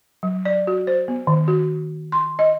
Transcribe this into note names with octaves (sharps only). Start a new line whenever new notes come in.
F#3
D5
F#4
C5
B3
D#3
F#4
C6
D#5